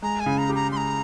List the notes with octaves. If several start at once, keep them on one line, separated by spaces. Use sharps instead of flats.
G#3 A#5
G#5
C#3
A#5
G4
A#5
G#3 A#5 C6